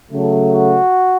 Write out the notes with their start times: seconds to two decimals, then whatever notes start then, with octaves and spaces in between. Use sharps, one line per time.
0.12 C#3 F#3 A3
0.54 F#4